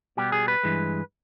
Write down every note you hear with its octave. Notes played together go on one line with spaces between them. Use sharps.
B2 G3 B3 G4
G#4
B4
G2 E3 G#3